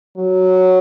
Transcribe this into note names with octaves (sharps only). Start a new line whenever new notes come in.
F#3